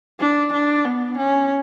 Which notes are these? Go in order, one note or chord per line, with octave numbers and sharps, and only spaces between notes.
D4
D4
B3
C#4